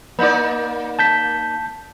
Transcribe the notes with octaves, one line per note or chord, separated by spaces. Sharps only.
A#3 D#4 D5
A5 G6 B6